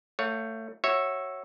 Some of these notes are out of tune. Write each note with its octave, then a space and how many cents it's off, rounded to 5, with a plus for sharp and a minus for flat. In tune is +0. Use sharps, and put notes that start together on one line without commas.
A3 +25 C#5 +5 F#5 -45
F#4 +10 C#5 -15 E5 +0